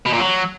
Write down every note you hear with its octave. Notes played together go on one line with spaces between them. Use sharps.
B2
A#2
F#3